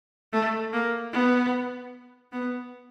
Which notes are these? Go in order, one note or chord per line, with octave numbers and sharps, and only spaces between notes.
A3
A#3
B3
B3